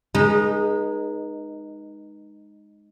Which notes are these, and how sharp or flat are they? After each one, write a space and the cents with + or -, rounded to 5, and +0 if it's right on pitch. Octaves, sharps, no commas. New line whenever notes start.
G#3 +0 D#4 -15 B4 -40